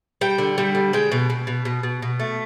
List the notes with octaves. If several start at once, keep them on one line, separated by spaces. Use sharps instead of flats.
G3 G5
D3
G3
D3
G#3 G5
B2
B2
B2
B2
B2
B2
A3